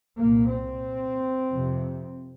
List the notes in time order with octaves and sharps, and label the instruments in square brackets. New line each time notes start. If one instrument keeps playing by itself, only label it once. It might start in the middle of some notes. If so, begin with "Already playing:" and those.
[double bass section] C2 A#2 A#3
C4
F2 C3